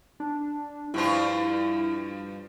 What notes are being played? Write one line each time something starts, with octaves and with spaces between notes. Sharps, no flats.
D4
G2 F3 E4 F4